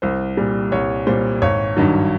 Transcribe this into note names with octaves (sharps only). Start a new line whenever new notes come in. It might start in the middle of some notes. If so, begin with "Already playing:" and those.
C2 C5
A#2 G3
C2 C#5
A#2 G3 C5
G#1 C#5
G2 D#3 F#3